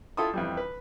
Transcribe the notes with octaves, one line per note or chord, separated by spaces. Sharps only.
E4 F4 A4 G5 C6 D#6
F2 E3 G3
B4